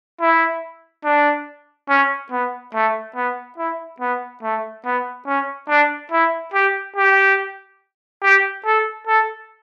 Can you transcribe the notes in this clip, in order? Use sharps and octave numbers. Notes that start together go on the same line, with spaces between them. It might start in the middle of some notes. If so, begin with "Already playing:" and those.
E4
D4
C#4
B3
A3
B3
E4
B3
A3
B3
C#4
D4
E4
G4
G4
G4
A4
A4